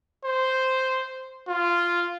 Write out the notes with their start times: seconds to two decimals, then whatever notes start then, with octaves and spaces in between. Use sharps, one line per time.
0.25 C5
1.48 F4